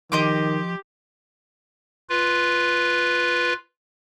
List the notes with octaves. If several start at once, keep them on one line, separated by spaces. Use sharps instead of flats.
D#3 F3 G4 D#5 C6 D6
F4 B4